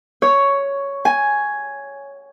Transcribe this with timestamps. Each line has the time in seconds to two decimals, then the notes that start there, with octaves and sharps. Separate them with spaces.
0.22 C#5
1.05 G#5